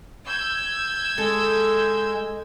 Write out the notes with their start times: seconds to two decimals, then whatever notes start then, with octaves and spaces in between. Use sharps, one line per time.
0.24 E6 G6 G#6
1.18 G#3 A4